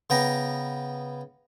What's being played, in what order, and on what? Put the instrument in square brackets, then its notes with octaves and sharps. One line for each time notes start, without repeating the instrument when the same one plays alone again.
[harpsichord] C#3 B3 G5 A#5